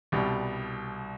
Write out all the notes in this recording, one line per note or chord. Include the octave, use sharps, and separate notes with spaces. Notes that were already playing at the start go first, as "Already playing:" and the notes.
C2 B2 G3